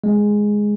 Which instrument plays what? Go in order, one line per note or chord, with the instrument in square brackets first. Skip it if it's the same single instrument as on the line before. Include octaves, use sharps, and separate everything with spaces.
[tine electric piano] G#3